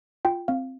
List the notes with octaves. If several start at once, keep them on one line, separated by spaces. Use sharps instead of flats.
F4 G5
C4 F5